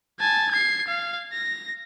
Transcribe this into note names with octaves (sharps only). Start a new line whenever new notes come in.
G#5 A5
G#6 C7
F5
A#6